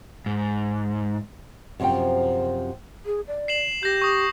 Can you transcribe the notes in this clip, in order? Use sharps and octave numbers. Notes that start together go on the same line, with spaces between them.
G#2
F#2 C3 F3 F4 G5
G#4
D5
C7 E7 F#7
G4 G6 A#6
C#6 D#6